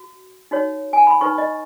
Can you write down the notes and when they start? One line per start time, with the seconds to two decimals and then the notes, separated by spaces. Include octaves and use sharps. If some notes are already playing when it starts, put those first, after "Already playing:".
Already playing: F#4
0.51 D#4 F#4 C#5
0.93 G#5
1.07 B5
1.21 D#4 B4 C#6
1.38 D#5